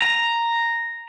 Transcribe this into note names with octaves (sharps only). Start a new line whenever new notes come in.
A#5